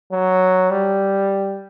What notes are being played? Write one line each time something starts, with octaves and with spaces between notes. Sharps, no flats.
F#3
G3